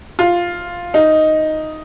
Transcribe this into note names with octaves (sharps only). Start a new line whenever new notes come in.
F4
D#4